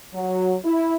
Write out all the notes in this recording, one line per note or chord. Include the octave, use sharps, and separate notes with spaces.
F#3
E4